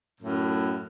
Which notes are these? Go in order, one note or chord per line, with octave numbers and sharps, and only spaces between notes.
F#2 A2